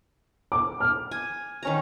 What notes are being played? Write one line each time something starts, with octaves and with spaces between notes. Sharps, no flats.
D6
F6
G#5
D#3 C#4 A#5